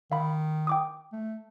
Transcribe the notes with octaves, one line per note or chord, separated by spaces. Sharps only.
D#3 F5 B5
G5 D6 D#6
A3